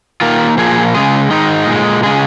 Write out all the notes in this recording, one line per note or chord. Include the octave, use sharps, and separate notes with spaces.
D#3 A#3 F4
A#2 F3 A#3 G#4
C#3 G#3 G#4
D#3 G#3 D#4
A#2 G#3
C#3 G#3 G#4